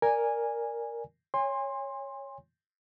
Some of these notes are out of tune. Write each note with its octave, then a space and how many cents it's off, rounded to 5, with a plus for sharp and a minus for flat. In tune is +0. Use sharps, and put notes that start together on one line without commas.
A#4 +0 D5 +0 G#5 -10
C#5 +0 G#5 -35 C6 +15